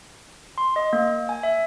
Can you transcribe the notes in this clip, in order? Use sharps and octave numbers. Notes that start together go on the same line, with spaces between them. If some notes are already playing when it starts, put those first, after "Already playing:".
C6
D#5
A#3
G#5
E5